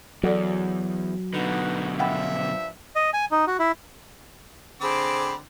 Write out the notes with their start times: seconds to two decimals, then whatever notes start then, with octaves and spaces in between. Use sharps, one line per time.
0.23 E2 F#3 F#4 A4 D5
1.34 B2 D3 D#4 B4 F#5
1.99 G2 F3 E5 F#5 G5 B5
2.96 D#5
3.13 G#5
3.32 D#4
3.47 F#4
3.59 E4
4.81 D3 C4 G#4 C5 B5 D6